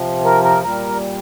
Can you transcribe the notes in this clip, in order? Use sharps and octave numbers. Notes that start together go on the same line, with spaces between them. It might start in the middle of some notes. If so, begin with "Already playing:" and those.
Already playing: C3 F3
A#4
A#4
A#2 G3 A#4